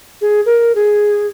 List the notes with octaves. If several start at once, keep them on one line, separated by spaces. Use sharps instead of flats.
G#4
A#4
G#4